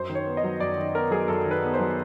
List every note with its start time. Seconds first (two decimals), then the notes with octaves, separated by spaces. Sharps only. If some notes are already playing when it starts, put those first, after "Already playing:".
Already playing: F#2 C5
0.09 D#3
0.15 C#5
0.27 B3
0.37 D#5
0.44 F#3
0.60 F#2 D5
0.77 D#3
0.95 B3 A#4
1.11 F#3 G#4
1.28 F#2 A4
1.46 D#3
1.51 B4
1.63 B3
1.74 C5
1.80 F#3